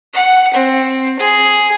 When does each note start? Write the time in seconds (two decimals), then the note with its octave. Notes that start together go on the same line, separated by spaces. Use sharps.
0.13 F#5
0.53 C4
1.19 G#4